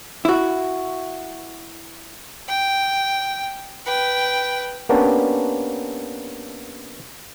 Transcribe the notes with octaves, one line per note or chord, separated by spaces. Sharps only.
E4 F#4
G5
B4 G5
A#3 B3 C#4 D4 G4 A5